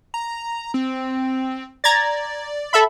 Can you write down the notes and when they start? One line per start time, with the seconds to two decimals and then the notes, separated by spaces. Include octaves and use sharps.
0.14 A#5
0.74 C4
1.84 D5 A#5 G#6 A6
2.73 A4 E5 B5